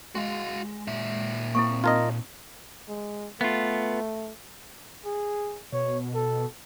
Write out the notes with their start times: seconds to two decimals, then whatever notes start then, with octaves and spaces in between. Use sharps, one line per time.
0.15 G#3 F#4 F5
0.88 A#2 E5
1.55 A#3 C4 E4 A4 C#6
1.84 D#4 F4 A#4 D#5
2.89 G#3
3.41 A3 B3 F4
5.05 G#4
5.73 B2 C#5
6.14 A4